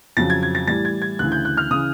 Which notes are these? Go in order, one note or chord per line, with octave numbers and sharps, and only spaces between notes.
F2 C#3 F#3 A6
G#6
G#6
A6
A2 E3 G3 A6
G#6
G#6
D2 C#3 E3 F#6
G6
F#6
F6
C#3 E3 D#6